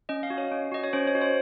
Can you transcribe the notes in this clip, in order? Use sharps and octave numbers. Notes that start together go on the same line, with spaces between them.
C#4 D#5
F5
F#4
C#5
C#4
F#4 D#5
C#5
C#4 C5
C#5
F#4
C5